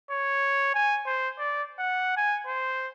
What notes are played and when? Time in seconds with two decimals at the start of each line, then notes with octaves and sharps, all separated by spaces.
0.11 C#5
0.75 G#5
1.07 C5
1.38 D5
1.79 F#5
2.17 G#5
2.47 C5